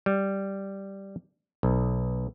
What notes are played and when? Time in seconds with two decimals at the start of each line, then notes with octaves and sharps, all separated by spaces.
0.06 G3
1.63 B1